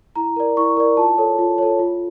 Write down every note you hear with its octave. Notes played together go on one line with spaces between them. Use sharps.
E4 A#5
A#4 D5
E4 C#6
A#4 D5
F4 A5
A4 C#5
F4
A4 C#5
F4